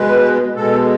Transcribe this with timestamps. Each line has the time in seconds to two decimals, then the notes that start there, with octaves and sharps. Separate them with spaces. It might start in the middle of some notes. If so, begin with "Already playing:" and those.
Already playing: B2 G#3 B4
0.56 B2 G#3 A4